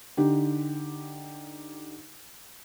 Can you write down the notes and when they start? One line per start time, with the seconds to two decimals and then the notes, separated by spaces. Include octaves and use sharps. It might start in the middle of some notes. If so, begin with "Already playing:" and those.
0.17 D3 D#4 G4